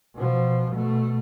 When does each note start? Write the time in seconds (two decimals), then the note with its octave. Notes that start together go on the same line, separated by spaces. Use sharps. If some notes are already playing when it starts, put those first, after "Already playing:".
0.16 B2 F3
0.72 B2 A3